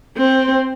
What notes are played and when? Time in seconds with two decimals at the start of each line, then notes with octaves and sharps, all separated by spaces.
0.17 C4